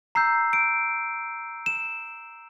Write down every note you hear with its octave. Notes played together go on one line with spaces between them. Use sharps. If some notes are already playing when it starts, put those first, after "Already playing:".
A#5 E6 G6 C7
D7
E7